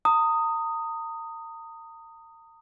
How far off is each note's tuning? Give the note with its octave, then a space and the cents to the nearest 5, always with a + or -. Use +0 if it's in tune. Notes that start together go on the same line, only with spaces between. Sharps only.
A#5 -40 D#6 +0